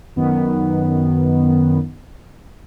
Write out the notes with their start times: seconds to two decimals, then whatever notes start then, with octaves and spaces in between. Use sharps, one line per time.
0.16 F#2 D#3 B3